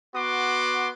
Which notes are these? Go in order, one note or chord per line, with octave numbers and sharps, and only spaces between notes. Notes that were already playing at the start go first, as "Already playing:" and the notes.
B3 F#4 C6 D6